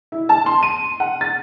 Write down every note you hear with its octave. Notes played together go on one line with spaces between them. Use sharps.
E4
A5
C6
D#7
F#5
A6